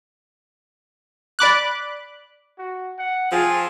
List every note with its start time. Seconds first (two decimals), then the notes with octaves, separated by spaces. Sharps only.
1.39 D5 B5 D6 F#6
2.58 F#4
2.99 F#5
3.32 F3 C4 F4 G#4